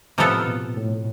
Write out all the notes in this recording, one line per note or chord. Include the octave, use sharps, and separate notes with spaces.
A2 C3 F3 B3 F4 A4
B2
A2